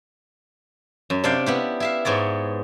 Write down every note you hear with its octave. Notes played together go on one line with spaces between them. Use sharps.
F#2
C3 D4 D5 F5 G5
B3 E4 G4
E4 E5 F5
G#2 B3 C#5 D5